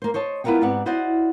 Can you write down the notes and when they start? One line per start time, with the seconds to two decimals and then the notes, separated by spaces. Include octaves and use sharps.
0.02 A#3 C5
0.14 C5 C#5 D#5 A5
0.44 B3 E4 F4 A#4 F#5 G5
0.61 G#2 B3 C4 G4 D5 F#5
0.86 E4 F#4 C5 D5 D#5 F#5